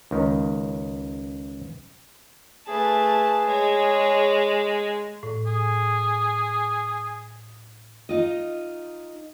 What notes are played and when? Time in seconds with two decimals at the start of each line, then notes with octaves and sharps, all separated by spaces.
0.11 C#2 D#3
2.68 A3 G#4 B4 A5
3.47 G#3 C#5
5.23 A2
5.46 G#4
8.09 D#4 F4 D#5